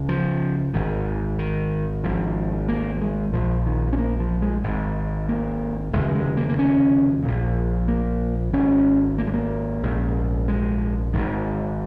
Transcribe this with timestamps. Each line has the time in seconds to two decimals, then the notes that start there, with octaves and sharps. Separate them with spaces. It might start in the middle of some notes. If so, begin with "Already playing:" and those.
Already playing: C#2 C#3
0.09 F3
0.74 G#1 G#2 D#3
1.39 D#3
2.04 G#1 G#2 F3
2.68 A#3
2.97 F3
3.02 G#3
3.33 A#1 A#2 F3
3.66 D#3
3.93 C#4
3.98 A#3
4.20 F3
4.42 G#3
4.64 G#1 G#2
5.29 A#3
5.93 F1 D#2 C#3 G#3
6.15 G#3
6.37 A#3
6.49 A#3
6.59 C#4
7.23 A#1 A#2
7.88 A#3
8.53 G#1 G#2 C#4
9.18 A#3
9.27 G#3
9.34 A#3
9.83 A#1 G#2
10.48 G#3
11.13 G#1 G#2 D#3